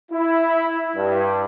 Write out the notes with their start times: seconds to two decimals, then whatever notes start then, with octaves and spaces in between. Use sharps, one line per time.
0.11 E4
0.96 G2